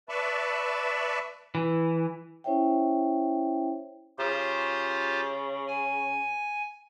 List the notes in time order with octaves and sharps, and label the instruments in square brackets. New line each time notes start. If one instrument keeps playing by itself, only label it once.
[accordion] B4 D5 E5 A5 B5 C#6
[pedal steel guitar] E3
[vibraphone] C#4 E4 C5 C#5 E5 G5
[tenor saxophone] C#3 [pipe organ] F4 G4 C5
[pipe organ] G#5